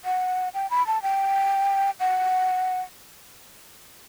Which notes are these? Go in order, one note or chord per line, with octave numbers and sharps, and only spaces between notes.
F#5
G5
B5
A5
G5
F#5